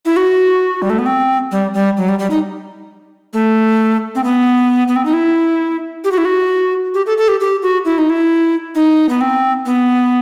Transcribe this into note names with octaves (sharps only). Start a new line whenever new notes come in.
E4
F#4
G3
A3
B3
C4
G3
G3
F#3
G3
G3
D#4
A3
C4
B3
B3
C4
D#4
E4
G4
F#4
E4
F#4
G4
A4
A4
G4
G4
F#4
E4
D#4
E4
D#4
B3
C4
B3